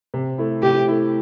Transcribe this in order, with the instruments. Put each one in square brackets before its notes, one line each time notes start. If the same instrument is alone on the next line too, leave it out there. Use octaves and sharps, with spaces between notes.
[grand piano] C3
A3 E4
[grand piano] C3 [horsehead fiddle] G4
[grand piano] A3 E4